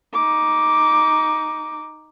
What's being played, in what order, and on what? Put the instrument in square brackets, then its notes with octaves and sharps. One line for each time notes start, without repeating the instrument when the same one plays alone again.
[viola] D#4 D6